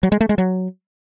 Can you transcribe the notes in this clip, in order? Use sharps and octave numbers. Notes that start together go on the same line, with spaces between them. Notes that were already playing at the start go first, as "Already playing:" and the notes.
F#3
G#3
A3
G#3
F#3